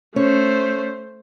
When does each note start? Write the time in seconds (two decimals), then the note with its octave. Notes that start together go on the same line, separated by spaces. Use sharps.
0.16 A3 C#4 C5 C#5